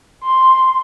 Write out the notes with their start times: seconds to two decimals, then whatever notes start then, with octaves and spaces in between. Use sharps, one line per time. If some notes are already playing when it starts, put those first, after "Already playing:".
0.23 C6